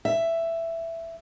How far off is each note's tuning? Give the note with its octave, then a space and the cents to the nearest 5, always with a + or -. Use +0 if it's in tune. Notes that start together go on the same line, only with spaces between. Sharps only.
E5 +10